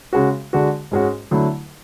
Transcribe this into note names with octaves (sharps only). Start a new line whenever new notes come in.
C#3 G#3 C#4 F#4
D3 G#3 D4 F#4
G#2 G#3 C#4 F#4
D3 F#3 A3 E4